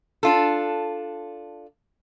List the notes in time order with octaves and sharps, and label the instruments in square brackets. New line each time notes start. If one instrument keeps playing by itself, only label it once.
[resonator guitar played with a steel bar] D4 F4 A4